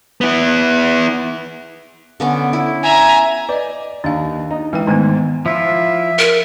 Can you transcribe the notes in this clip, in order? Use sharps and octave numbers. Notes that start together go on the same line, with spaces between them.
B3 E4
D3 B3 C#4
E4
E5 G#5 A#5
B4 D5 D#5
D#2 D4 F5
D#4
E3 G#3 G5
G#2 D#3 A3 B3
F3 E4 F4 E5
A#4